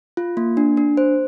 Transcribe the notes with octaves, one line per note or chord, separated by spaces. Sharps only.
F4
A#3
D4
D4
C5